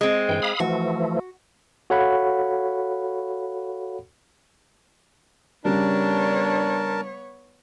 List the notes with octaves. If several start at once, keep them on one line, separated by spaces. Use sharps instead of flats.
G#3 C4
G2 E3 G5
F5 B5 D#6
E3 F3 A3 F#4
F#4 A4 C#5 F5 F#5 B5
C#3 G3 B3 D4 A#4 C#5 A5